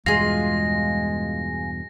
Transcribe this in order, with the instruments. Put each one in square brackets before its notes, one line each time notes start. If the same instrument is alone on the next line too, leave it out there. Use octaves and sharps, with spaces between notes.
[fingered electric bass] E2 G2 B2 [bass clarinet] G#3 [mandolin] F4 G#4 [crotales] A#6